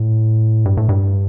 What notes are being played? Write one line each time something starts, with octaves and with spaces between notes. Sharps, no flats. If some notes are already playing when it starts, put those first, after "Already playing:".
Already playing: A2
G2
A2
G2